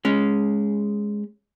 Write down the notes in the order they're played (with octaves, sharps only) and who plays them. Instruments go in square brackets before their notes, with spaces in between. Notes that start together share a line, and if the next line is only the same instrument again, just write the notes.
[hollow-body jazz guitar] G#3 C#4